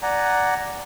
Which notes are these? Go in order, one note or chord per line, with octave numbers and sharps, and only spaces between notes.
D5 F#5 G#5 A#5